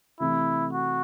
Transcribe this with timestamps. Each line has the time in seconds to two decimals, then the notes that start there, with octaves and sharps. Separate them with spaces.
0.20 C3 E3 A3 E4
0.73 F#4